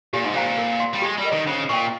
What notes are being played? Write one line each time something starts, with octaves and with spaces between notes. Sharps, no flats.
A#2 G4
G#2
A#2 C5 F5 A#5
A#4
F5 C6
G3
G#3 G4
G3
A#4 D#5
D#3
C#3 C5
A#2 G5 C#6